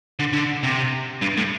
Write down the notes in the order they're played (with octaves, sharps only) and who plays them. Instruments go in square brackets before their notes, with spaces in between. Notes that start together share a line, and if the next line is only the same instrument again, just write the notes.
[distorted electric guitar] D3
D3
C3
G2
A2